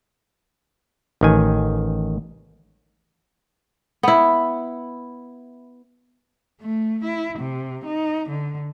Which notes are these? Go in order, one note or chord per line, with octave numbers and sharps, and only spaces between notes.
A1 D#3 G#5
B3 E4
A3
E4
C3
D#4
D3